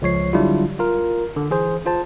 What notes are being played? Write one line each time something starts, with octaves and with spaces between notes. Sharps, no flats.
C#2 F3 C#5 C7
D3 F#3 G3 D4 E4 F4
F4 A#4
D3
E3 G#4 C5
F4 C5 A5